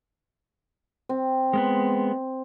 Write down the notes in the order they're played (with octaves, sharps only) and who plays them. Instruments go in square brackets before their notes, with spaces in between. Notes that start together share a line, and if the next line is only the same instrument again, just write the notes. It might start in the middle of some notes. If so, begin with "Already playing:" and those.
[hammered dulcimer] C4
[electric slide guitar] G#3 A#3 B3